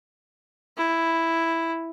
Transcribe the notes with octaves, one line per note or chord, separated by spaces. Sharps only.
E4